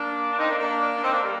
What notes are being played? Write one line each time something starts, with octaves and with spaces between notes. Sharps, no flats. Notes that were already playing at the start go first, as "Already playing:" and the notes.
Already playing: A#3 D4
D4
C4 D#4
A#3 D4
A#3 D4
D4
C4 D#4
A#3 D4
G3 A#3